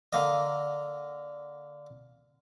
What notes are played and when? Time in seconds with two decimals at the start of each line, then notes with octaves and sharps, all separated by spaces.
0.13 D3 A#3 D#5